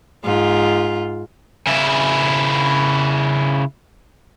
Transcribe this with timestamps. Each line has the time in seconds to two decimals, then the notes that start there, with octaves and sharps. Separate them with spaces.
0.24 G#2 F4
1.67 C#3 E4